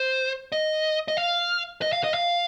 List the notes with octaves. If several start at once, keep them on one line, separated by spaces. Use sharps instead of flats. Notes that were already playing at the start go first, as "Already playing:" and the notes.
Already playing: C5
D#5
D#5
F5
D#5
F5
D#5
F5